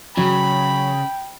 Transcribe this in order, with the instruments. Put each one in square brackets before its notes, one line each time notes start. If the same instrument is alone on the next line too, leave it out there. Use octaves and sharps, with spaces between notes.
[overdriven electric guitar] C#3 [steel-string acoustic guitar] F#3 [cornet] G5 [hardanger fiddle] B5